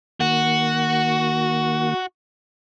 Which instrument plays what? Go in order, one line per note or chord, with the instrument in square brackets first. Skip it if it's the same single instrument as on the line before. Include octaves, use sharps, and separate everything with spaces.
[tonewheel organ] D#3 A#3 [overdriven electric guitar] F#4